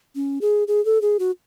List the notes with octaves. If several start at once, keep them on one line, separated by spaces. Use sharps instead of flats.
C#4
G#4
G#4
A4
G#4
F#4